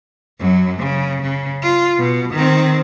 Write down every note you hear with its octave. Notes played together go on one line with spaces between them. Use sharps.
F#2 F#3
C#3
C#3
F4
B2
D#3 C4